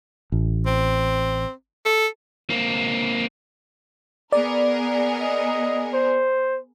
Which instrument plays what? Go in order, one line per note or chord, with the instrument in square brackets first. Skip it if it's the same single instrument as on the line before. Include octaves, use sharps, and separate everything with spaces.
[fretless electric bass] A1
[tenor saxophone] C4
A4
[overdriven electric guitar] A#3 C4
[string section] B3 G#4 A#4 [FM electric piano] D5
[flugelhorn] D#5
C5